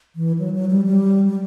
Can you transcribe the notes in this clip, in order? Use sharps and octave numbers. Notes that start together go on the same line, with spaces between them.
E3
F#3
F#3
G3
G3
G3